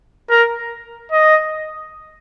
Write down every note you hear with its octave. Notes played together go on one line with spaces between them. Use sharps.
A#4
D#5